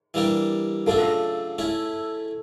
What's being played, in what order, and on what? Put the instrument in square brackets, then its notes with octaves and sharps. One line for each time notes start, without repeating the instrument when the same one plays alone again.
[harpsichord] E3 G3 A#3 D4 G4
[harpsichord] C#3 F#3 A3 D4 F4 [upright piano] A4
[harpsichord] A3 C#4 E4